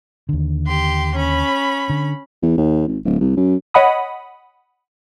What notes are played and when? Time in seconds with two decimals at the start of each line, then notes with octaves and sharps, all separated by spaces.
0.29 D#2 D3
0.67 G4 C6
1.15 C#4 B5
1.90 D3
2.42 E2
2.58 D#2
2.87 G#1
3.05 D1
3.21 C2
3.37 F#2
3.74 C#5 D#5 F#5 B5 D#6